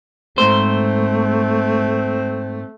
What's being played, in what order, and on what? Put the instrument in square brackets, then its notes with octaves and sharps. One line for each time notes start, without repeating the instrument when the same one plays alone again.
[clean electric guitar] G#2 C5 [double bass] A3 [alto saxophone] C4